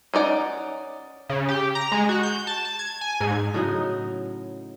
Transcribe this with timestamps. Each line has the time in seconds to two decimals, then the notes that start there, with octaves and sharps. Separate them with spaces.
0.14 C#4 D#4 D5 F#5
1.29 C#3
1.49 G4
1.75 A#5
1.92 G#3
2.09 F#4
2.23 G6
2.47 A5
2.65 A5
2.79 G#6
3.01 G#5
3.20 G#2
3.54 A2 C#3 F#3 D#4